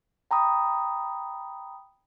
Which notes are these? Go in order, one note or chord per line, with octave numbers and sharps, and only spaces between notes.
G5 A#5 B5 D#6